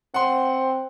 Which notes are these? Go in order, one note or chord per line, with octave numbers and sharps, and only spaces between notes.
C4 F#5 C6